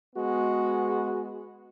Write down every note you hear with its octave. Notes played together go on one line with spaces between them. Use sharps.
G#3 B3 F#4